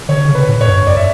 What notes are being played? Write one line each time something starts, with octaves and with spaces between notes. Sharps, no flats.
D3 C#5
C#3
B4
A2
C#5
G2
F#2 D5
E5